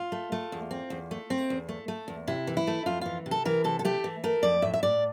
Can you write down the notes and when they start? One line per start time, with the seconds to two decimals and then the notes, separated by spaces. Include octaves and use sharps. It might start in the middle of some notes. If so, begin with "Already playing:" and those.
Already playing: F4
0.12 A3
0.32 A3
0.52 E2
0.71 C4
0.90 E2
1.11 A3
1.30 C4
1.50 E2
1.69 A3
1.88 A3
2.08 E2
2.27 C3 E4
2.47 E3
2.57 E4
2.67 A3
2.86 F2 F4
3.01 E3 F4
3.26 C3
3.31 A4
3.45 E3 A#4
3.64 C3 A4
3.79 A4
3.85 A3 G4
4.04 E3
4.24 A3 A#4
4.43 F2 D5
4.62 A2 E5
4.74 E5
4.83 A2 D5